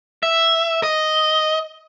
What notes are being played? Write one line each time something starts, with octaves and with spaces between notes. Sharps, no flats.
E5
D#5